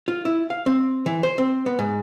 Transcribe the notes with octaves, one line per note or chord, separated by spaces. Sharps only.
F4
E4
F5
C4
E3
C5
C4
B3
G#2